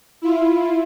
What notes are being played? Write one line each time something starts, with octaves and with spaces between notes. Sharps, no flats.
E4 F4